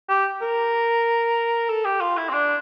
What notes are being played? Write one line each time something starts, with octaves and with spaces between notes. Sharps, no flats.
G4
A#4
A4
G4
F4
E4
C4
D4